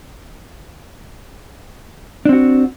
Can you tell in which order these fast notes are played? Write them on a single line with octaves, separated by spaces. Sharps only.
D4 C4 F#4